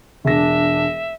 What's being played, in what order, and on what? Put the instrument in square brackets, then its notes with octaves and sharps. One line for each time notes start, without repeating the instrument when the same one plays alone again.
[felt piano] E1 A#6 [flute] D4 [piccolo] E5